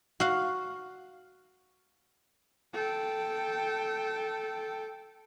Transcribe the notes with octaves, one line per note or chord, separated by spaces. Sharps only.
F#4 F5
A4 G5